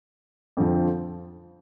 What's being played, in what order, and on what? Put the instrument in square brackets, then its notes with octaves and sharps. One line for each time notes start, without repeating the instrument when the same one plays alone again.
[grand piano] F2 D3 F3 C4